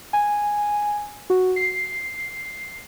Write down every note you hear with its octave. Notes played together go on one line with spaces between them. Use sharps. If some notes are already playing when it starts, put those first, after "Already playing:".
G#5
F#4
C7